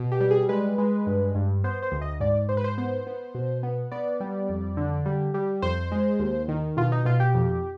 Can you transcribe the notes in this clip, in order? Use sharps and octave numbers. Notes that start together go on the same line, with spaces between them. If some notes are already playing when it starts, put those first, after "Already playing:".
Already playing: B2
G4
G3
G#4
G#3 B4
G#3
G2
G2
B3 C5
C5
D2
D#5
G#2 D5
G#2 C5
B4
C5
B3 C5
B3
B2
B3
B3 D5
G3
F2
D3
G3
G3
F2 C5
G#3
D#2
D#3
B2 F4
D#4
B2 F4
G4
F2